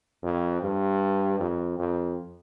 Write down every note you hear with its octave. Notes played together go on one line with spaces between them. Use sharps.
F2
G2
F2
F2